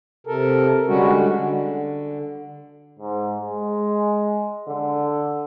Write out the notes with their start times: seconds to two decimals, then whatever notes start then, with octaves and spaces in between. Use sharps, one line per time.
0.27 C3 A4 A#4
0.88 D3 G3 G#3 C#4 F#4
1.20 D3
2.99 G#2
3.41 G#3
4.68 D3